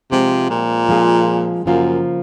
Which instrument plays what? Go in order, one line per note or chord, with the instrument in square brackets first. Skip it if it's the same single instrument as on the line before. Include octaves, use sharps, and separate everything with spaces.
[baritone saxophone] C3 [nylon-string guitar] F3 G#3 C4 F4 G#4
[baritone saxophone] A#2
[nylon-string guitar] F3 G#3 C4 F4 G#4
[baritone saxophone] F#2 [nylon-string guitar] C#3 F3 A#3 F4